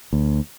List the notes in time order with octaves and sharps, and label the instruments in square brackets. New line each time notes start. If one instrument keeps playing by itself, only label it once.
[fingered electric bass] D2